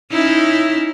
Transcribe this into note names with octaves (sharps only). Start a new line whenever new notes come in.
C#4 D#4 E4